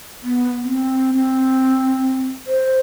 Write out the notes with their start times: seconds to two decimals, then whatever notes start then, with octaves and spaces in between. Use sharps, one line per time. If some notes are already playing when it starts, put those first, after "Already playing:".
0.23 B3
0.63 C4
1.14 C4
2.47 C5